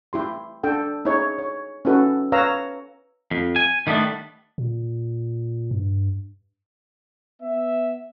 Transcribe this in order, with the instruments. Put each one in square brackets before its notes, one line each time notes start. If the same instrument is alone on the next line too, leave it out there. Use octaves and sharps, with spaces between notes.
[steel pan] E4 G4 C6
D4 A4 G5
D#4 E4 G#4 C#5
C#5
C#4 D#4 E4 F#4 A4 B4
B4 C#5 F5 A#5 E6
[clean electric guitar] F2
G#5
D#3 G3 A3 B3 D4
[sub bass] A#2
G2
[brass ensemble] B3 E5